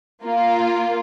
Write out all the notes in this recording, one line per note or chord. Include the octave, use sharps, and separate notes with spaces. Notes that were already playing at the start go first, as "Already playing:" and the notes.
A#3 F4